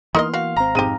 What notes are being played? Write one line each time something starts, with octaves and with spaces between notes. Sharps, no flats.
E3 A#3 B3 D#4 A#4 D#5 C6 F6
F#4 F5
G#1 C4 A#5
F2 G#2 G#3 G4 D#7